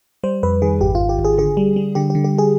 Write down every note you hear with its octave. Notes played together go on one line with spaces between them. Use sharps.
G3 C5
F2 B4
D#3 G#4
G#1 G4
F4
G#1
G4
G#1
G#4
D3 G#4
G3
G3
D3 G4
G4
D3
G4
G#4